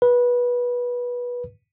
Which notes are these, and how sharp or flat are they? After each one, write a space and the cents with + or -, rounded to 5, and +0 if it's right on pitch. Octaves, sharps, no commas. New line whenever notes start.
B4 -20